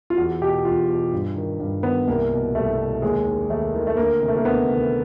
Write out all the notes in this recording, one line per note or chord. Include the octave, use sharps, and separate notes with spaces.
F4
E2 F#4
B2 G4
E2 F4
B2
G2
D#3
G2
D#3 B3
C2 A#3
B2
C2 A3
B2
D#2 G#3
D#3
D#2 A3
D#3
A3
D2 A#3
C3 D#3
A3
A#3
D2 B3
C3
D#3